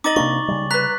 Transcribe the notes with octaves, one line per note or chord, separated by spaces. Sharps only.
D#4 D#5 D6 A6 F#7
C3 A#3 D4 C#6
C#3 G3
B4 A#5 F#6 B6